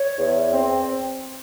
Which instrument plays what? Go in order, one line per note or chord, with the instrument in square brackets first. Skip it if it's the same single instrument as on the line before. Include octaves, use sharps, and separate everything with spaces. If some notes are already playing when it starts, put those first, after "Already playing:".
Already playing: [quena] C#5
[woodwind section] E2
C4